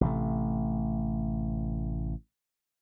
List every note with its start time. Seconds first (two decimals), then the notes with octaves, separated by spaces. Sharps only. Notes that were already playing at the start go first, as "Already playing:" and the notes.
0.01 A1 C3 A3